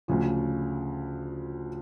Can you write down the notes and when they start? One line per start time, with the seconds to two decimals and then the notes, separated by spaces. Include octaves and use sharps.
0.08 D2 C#3 F3